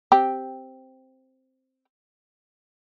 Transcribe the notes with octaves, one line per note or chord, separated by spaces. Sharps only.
C4 G4